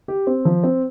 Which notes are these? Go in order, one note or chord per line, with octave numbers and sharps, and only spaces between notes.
G4
C4
F3
C4